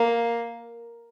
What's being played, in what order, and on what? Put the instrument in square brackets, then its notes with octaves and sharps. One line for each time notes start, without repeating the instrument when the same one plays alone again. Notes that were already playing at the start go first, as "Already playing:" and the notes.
Already playing: [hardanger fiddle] A#3